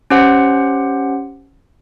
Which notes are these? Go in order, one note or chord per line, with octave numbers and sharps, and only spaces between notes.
C#4 G4 C5 F#5